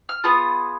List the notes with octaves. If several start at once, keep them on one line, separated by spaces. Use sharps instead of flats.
F6
B3 F4 G#4 D#6